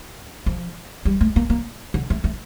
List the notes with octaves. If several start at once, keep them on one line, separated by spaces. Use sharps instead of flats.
F3
G3
A3
A#3
A#3
D3
A3
A3